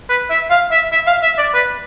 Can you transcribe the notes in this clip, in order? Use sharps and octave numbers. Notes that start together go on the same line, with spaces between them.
B4
E5
F5
E5
E5
F5
E5
D5
B4